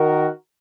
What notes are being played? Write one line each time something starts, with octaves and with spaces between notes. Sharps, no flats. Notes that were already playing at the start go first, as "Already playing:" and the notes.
Already playing: D#3 F#4 A#4